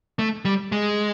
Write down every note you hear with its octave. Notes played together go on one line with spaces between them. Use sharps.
A3
G3
G#3